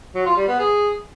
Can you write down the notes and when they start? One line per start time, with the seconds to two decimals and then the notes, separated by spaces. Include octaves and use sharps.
0.15 F#3
0.26 F4
0.37 G3
0.48 B3
0.59 G#4